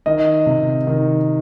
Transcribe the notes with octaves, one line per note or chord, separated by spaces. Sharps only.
D#3 D#5
C3
D#3